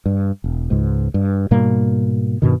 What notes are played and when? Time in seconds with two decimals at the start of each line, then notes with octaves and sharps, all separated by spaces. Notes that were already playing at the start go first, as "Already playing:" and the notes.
0.06 G2
0.44 E1
0.70 C#2 G#2
1.14 G2
1.51 G#2 B2 G3 A#3
2.42 G2 B2 D#3